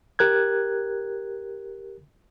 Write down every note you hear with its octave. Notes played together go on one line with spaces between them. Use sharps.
G4 A#4 F#6 G#6